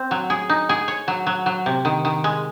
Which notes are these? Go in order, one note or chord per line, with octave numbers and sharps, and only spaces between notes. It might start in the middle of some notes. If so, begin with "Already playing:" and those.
Already playing: C4
F#3
G#4
D#4
G#4
C#5
F#3
F#3
F#3
C3
D#3
D#3
G#3